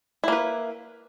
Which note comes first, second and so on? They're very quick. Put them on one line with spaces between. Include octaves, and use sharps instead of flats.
E4 A#3 B4